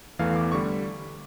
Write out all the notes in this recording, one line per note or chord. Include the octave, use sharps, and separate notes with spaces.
E2 E3 A3 F5
D6
D3 G3 C#6